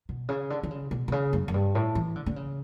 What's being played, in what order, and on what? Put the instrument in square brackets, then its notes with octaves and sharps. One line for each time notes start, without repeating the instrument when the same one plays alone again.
[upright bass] B2
C#3
D3
D3
C#3
B2
B2
C#3
F#2
F#2
G2
A2
E3
D3
D3
C#3